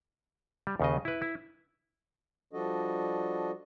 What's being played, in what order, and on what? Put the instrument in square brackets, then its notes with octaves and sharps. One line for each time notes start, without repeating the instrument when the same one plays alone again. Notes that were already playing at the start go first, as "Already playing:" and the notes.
[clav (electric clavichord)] G3
D#2 C#3 D#5
E4 B4
E4
[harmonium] F3 G3 D4 F#4 A4 D#5